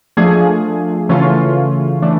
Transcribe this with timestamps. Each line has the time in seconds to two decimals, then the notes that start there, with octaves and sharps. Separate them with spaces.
0.17 F3 A3 D4 F4 G#4
1.09 C#3 E3 A3 C#4 F4
2.02 E3 A3 D4